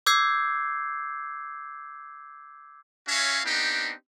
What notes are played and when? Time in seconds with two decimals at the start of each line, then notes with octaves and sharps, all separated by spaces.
0.06 D6 E6 G6 G#6 C7
3.08 C#4 F#4 C#5 E5 F5
3.45 B3 C4 D4 D#4 G4